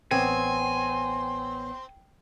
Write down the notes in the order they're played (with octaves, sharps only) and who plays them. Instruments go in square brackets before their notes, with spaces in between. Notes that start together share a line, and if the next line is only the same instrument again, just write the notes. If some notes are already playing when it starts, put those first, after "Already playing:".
[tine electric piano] A1 B3 C#5 [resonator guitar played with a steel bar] C4 [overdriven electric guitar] G#5 [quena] C6